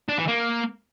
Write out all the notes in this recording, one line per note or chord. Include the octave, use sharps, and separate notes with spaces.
D4
E3
A#3